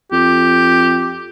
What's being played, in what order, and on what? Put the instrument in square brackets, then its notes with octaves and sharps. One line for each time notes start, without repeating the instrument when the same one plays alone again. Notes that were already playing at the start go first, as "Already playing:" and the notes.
[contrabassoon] F2 [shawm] G4